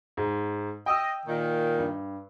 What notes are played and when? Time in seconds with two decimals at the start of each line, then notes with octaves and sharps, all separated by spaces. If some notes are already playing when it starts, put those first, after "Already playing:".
0.17 G#2
0.86 D#5 G5 D#6 E6
1.26 A#2 D#3
1.78 G2